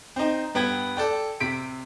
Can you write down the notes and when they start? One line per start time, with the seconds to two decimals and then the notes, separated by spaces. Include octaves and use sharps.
0.16 C4 D#4
0.55 G2 B3 G5 B5 G#6
0.97 A4 D5 G5
1.40 C3 B6 D7